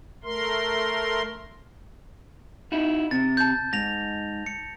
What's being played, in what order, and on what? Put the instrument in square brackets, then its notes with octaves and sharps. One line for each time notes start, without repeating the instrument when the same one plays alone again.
[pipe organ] A3 A#4 C6
[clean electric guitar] D#4 E4 F#4
[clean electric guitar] C3 [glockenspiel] A6
[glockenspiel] A5 G6
[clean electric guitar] G#2 [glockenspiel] A#6 F7
[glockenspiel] C#7